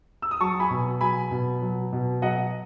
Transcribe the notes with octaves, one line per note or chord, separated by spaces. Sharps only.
E6
D#6
F#3 A5 C#6
G#5 B5
B2
F#3 G#5 B5
B2
F#3
B2
F#3 D#5 F#5